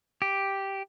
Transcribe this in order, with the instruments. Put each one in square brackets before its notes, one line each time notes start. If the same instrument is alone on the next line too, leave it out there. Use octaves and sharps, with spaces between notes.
[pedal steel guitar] G4